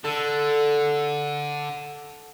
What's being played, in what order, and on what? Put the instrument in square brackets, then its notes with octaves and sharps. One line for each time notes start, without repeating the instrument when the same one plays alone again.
[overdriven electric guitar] D3 [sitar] A4